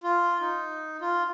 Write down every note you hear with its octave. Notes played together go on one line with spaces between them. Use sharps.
F4
D#4
F4